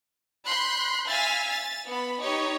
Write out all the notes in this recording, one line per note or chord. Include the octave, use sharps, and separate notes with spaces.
B5 C6 F#6 G6
E5 F5 G#5 F6 A6 B6
A6
B3 B5
D#4 G4 C#5 D#5